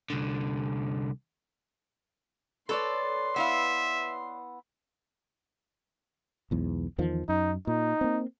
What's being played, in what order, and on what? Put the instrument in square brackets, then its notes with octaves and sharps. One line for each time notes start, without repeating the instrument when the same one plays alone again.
[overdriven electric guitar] C2 D3
[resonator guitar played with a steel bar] A4 [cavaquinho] B4 C#5 D5 [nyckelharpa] C6
[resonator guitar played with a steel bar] B3 E4 F5 [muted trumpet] E5
[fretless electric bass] B1 E2 G#2
E2 D#3 F3
[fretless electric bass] F#2 [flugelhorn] D#4
[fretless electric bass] A#2 [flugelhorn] D#4
[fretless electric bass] A#3 C4